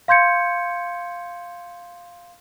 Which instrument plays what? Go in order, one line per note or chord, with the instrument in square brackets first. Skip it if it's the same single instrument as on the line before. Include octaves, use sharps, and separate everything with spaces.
[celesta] F5 C6 G6 G#6 C#7